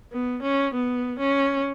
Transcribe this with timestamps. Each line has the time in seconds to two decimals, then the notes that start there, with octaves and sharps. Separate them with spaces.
0.12 B3
0.43 C#4
0.74 B3
1.19 C#4